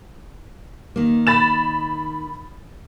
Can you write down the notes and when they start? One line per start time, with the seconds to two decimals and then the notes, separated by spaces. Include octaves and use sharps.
0.96 D#3 A#3
1.27 B5 A6 E7